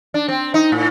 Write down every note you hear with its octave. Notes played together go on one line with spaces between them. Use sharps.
D4
C4
D#4
A2